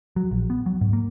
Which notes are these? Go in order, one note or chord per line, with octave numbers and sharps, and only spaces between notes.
F#3
A#1
B3
F#3
G#2
A#3